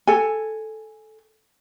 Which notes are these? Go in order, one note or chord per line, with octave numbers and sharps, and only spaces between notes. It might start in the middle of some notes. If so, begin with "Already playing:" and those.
A4 G#5